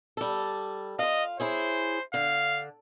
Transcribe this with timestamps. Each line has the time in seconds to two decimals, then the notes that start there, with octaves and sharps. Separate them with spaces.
0.17 G3 A4
0.99 F4 D#5 F5
1.40 E4 G#4 C5 C#5
2.14 D3 F5